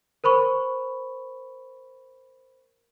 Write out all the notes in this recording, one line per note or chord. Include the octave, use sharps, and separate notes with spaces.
A#4 C5 B5 C#6